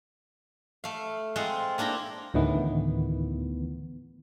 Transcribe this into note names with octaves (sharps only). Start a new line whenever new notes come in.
A3 F5
G#3 C4 F4 F#5
A#3 D4 E4 G5 A#5
D2 A2 D#3 E3 B3